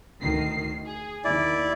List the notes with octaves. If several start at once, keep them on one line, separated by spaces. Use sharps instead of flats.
D2 D#3 C7
G#4
D#2 E4 D5